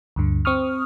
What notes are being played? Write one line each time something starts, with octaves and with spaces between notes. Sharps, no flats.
D2 G2 D3
C4 C#6 D#6 F6